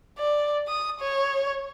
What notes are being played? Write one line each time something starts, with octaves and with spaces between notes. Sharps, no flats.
D5
D#6
C#5